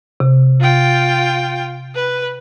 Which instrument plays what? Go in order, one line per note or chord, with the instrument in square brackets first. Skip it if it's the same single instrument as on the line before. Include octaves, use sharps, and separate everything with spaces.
[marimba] C3
[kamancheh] F4 G5
B4